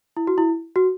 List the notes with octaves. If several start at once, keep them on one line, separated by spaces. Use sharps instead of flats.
E4
F#4
E4
F#4